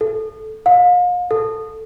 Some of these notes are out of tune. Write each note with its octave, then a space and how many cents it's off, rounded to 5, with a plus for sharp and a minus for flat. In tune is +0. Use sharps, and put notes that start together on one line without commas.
A4 -10
F5 +40
A4 +5